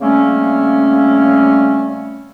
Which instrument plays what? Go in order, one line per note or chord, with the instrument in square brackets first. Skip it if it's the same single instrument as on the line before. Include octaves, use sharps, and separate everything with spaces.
[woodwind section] C#3 G3 A3 A#3 C4 C#4